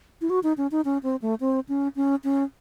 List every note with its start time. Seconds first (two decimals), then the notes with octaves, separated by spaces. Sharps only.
0.21 E4
0.30 F#4
0.43 D#4
0.57 C#4
0.71 D#4
0.85 C#4
1.03 C4
1.22 A3
1.40 C4
1.69 C#4
1.96 C#4
2.24 C#4